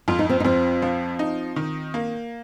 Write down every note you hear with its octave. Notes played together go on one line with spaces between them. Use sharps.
F2 F4
D#4
C4 F4
D#4
F2 C4 F4
F3
D#4
D#3
A#3